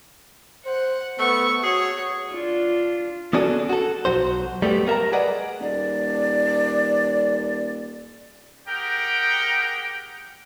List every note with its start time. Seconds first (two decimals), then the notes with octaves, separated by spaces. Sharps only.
0.66 C5 F#5
1.19 A3 B3 C#6
1.64 F#4 G#4 C#5
2.30 D4 F4
3.33 B3 C#4 D4 F#4 G#4 A4
3.69 F#4 A4
4.05 B1 F#2 F#3 F#4 C5
4.62 G3 A3 B3 G4
4.87 B3 A#4 E5 A5 A#5
5.12 G#4 B4 D5 D#5 F#5
5.60 D#1 D5
8.68 G4 G#4 A#4 F#5 G5